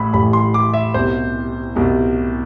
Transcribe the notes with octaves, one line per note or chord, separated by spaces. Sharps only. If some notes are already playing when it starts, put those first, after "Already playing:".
Already playing: A1 A2 B5
A1 A2 G3 B5
C6
D6
E5
C2 B2 G3 C5
C2 B2 G3